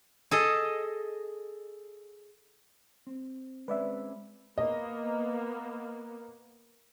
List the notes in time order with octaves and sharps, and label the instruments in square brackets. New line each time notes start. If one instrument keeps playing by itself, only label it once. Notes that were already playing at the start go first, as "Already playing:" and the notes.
[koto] G#4 A4 D#5
[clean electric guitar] C4
[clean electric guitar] G#3 C4 C#4 [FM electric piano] B4 D5 E5
[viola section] A#3 B3 [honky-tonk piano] D#5